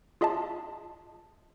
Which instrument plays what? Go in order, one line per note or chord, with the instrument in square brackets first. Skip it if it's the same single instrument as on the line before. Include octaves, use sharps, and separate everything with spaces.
[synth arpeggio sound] F4 G#4 D#5 E5 A5